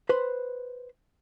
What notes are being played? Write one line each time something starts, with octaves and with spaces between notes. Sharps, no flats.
B4 C5 B5 C6